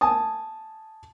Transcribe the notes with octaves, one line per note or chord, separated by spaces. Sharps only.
G#5 A5 D#6